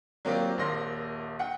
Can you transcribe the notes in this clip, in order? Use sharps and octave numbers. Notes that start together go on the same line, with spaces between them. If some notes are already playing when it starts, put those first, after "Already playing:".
F#3 A#3 C4 F4 G4 D5
D#1 A#1 A#4 C6 A#6
F#5 G5